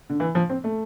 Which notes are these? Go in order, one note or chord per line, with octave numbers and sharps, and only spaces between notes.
D3
E3
F3
C4
A3